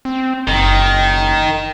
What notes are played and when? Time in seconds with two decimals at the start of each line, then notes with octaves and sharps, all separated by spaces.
0.05 C4
0.47 F#1 D#3